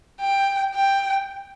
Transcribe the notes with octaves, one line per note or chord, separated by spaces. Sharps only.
G5
G5